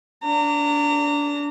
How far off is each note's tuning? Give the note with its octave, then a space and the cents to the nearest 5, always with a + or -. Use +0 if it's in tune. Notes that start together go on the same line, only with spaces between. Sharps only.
D4 -25 A#5 -30